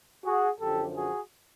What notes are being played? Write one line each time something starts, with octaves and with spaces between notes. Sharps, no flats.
F#4 G#4
F#2 D3 F3 G4 A4
F#4 G#4